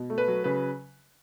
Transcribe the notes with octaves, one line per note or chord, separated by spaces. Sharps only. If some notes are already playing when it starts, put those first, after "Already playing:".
Already playing: B2
A3
B4
F#3
C#3 B4